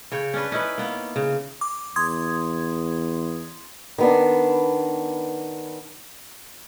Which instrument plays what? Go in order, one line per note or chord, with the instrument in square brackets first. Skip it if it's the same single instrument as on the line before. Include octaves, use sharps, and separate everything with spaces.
[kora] C#3 C#5 G5
C#4 D4 B4
C#4 D#4 E4 B4
A#3 B3 C#4
C#3
[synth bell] D6
[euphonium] E2 [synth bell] C6 D#6 G#6
[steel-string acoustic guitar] D#3 B3 D4